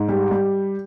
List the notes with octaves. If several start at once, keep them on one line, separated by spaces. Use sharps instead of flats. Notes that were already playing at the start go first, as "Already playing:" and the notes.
Already playing: G#2
G3
G3